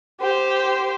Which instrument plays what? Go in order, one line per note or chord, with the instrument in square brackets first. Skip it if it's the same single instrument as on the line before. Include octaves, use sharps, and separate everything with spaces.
[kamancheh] G4 C5